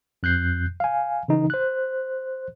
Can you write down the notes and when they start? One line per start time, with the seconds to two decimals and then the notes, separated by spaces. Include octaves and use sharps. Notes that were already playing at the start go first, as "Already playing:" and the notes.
0.23 F2 F#6 G6 C7
0.80 F5 G#5
1.28 C#3 E3 D#4
1.50 C5 F#6